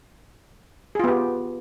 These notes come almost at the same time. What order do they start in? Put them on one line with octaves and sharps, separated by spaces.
G#4 F4 B3 G4